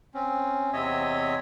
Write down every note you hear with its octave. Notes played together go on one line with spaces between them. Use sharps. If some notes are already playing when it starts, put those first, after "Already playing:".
C4 C#4
E2 C3 C4 C#5 D#5 E5